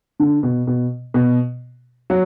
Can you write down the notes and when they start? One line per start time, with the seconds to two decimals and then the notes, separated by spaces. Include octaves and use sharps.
0.20 D3
0.43 B2
0.67 B2
1.14 B2
2.10 F#3